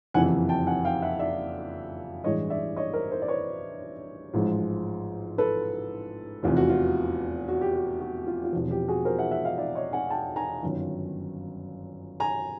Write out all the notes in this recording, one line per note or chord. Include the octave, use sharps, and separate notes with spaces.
F#1 F2 C3 E3 F#5 G#5
G5 A5
F#5 G#5
F5 G5
E5 F#5
D5 E5
A1 G2 E3 G#3 C#5 D#5
D5 E5
C#5 D#5
A#4 C5
A#4 C5
D5
B4 C#5
A1 G#2 F3 G#3
A4 B4
F1 E2 C3 E3 F4
F#4
F4
F#4
G4
F#4
F#4
F4
F4
E1 E2 C3 F3 F#4
F4 G4
F#4 G#4
A#4 C5
E5 F#5
E5 F#5
D#5 F5
D5 E5
C#5 D#5
F#5 G#5
G5 A5
G#5 A#5
G1 F#2 D#3
G#5 A#5